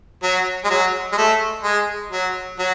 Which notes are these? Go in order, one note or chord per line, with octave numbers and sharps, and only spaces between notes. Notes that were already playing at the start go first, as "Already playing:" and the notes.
F#3
G#3
F#3
G#3
A3
G#3
F#3
F#3